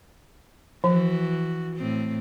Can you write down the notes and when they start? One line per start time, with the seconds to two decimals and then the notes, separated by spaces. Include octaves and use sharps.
0.84 E3 F3 F#4
1.75 A2 C4